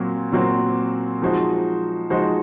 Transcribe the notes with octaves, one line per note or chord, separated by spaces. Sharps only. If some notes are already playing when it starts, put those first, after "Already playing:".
Already playing: A#2 F#3 C4 F#4
A#2 F#3 C4 F#4 C5
F3 G#3 D#4 F#4 C5
F3 G#3 D#4 F#4 C5